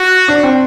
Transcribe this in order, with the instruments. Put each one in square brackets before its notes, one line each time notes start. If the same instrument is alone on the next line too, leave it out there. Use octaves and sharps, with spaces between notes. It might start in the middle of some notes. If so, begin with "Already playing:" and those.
Already playing: [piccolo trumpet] F#4
[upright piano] D4
C4